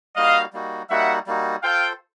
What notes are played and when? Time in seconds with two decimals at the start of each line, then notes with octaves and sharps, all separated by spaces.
0.16 G3 A#3 D#4 F#4 D#5 F5
0.53 G3 A#3 D#4 F#4
0.90 G3 A#3 D#4 F#4 E5 F#5
1.27 G3 A#3 D#4 F#4
1.63 F4 A4 C5 F5 G5